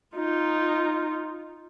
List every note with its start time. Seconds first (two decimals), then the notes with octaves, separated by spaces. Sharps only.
0.17 D#4 F4